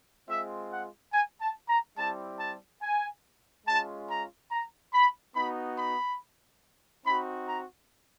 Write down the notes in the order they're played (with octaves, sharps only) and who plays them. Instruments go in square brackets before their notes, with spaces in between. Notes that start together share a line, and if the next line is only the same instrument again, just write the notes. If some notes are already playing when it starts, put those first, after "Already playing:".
[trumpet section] G#3 C4 F4 E5
F#5
G#5
A5
A#5
G3 C4 E4 G4 A5
A5
G#5
G#3 C#4 F4 A5
A#5
A#5
B5
B3 D#4 F#4 B5
B5
C4 D#4 F#4 B5
A#5